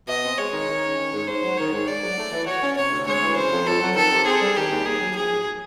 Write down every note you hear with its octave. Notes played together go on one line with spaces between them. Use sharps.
B2 D#5
C4
G#3 C#5
D#3
D#3
C#4
D#3
G#2
G#2 C5
F#3
D#3 C#5
G#2
G#2 D5
F#3
A3
E3
F#4 C#5
C#4
C3 C#5
D2
G#3 C#5
E3
C#3 C5
F2
F2 A4
F#3
D#3 A4
C3
C4 G#4
G3
D#3 G4
D#2
D#2 G#4
F#3
F3 G#4
G#2